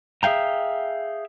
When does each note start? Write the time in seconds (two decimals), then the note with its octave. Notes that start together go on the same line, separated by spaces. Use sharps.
0.23 G#4 E5 F5 G5 A#5